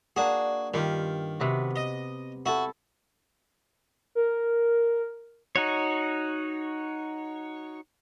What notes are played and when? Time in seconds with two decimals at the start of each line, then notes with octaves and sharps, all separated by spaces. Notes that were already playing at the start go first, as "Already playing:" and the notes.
0.16 A#3 D4 F#4 G#4
0.74 G2 D#3 F4 G4
1.40 C3 B3 F#4
1.76 D#5
2.46 E4 F#4 A4
4.15 A#4
5.56 D#4 F#4 C#5